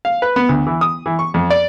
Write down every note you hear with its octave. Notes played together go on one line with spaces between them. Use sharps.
F5
B4
B3
D2
E3
D#6
E3
C#6
F2
D5